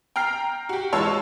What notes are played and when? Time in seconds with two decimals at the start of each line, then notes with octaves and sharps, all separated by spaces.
0.16 G5 A#5 F6 C7
0.69 F#4 G4
0.93 E3 G#3 F4 C#5 A5 E6